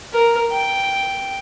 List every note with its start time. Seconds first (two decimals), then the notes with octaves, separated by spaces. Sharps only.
0.13 A#4
0.52 G5